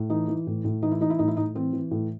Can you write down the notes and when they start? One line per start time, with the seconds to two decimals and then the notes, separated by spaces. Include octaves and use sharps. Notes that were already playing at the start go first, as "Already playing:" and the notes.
Already playing: A2
0.10 E3 D#4
0.28 E3
0.47 A2
0.64 A2
0.82 E3 D#4
0.91 E4
1.01 E3 D#4
1.10 E4
1.19 A2 D#4
1.28 E4
1.37 A2 D#4
1.55 E3 C4
1.73 E3
1.91 A2